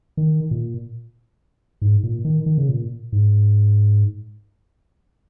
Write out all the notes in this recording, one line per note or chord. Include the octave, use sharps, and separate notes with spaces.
D#3
A#2
G#2
A#2
D#3
D#3
C#3
A#2
G#2